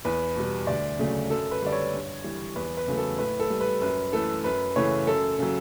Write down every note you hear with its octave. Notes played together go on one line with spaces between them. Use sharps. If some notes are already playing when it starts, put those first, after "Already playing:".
E2 B4
B2 G3
D2 D5
C#3 F#3 A3
F#2 A4
B4
D3 G3 D5
C#5
G2
E3 G3
E2 B4
B4
C#3 F#3 A3
A4
A2 B4
A4
G3
B4
F#2 B4
E3 A3 A4
F#2 B4
C#3 E3 A3 C#5
F#2 A4
C#3 F#3